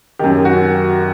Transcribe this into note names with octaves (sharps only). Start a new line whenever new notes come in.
F#2 D#3 G4
F#4